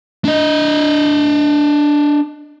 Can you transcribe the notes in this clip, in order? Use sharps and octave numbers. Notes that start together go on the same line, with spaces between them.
D4 D#5